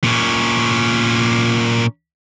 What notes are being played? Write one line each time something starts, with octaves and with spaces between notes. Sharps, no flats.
A#2 C#4